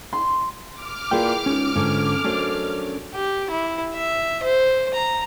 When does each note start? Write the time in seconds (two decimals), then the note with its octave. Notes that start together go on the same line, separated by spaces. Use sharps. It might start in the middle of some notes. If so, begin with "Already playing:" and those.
0.13 C6
0.72 D6 F6
1.11 A#2 E4 G#4 B4 G5
1.46 C#2 C#4 D#4
1.76 G#2 D3 C#4
2.24 F#2 A3 C#4 D4 A4 C5
3.14 G4
3.51 E4
3.93 E5
4.43 C5
4.94 A#5